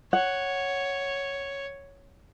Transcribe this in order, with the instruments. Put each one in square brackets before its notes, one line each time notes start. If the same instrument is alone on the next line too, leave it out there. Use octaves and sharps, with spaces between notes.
[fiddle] C#5 [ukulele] F#5